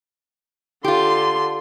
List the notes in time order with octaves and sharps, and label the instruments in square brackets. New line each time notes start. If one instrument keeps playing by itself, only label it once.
[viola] D3 C6 [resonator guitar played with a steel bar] F4 G4